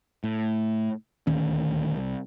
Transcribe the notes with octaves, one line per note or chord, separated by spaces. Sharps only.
A2
D#1 D2 D#3 C#4
C2